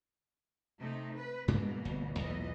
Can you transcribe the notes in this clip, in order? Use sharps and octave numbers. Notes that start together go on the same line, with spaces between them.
C3 A3 D#4
B4
G2 B2 E3 G#3 A#3 D4
D1 G1
B1 E2 A#2 E3 D#5